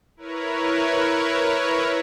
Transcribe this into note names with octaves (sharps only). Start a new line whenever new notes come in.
E4 A#4 B4 C#5